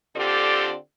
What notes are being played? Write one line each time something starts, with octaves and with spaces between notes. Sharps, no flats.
D3 C4 F4 G4 A4 D5